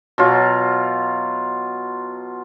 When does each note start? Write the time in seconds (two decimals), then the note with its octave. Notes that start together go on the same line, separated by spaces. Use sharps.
0.18 B2 F#3 F4